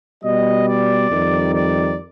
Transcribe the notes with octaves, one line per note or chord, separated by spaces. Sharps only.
B2 G3 D#5
D5
F2 D#3 G3
D5